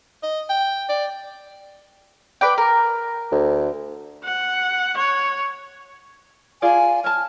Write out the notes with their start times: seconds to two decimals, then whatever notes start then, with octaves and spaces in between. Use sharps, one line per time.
0.23 D#5
0.50 G5
0.89 D5
2.41 B4 D5 G5
2.58 A#4
3.32 D2
4.24 F#5
4.97 C#5
6.62 F4 G#4 D5 G#5
7.04 C#5 A5 F6